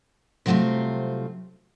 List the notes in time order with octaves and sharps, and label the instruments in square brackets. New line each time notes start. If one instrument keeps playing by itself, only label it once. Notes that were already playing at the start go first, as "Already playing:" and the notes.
[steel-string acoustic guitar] C3 F#3 G3 A3 C4 F4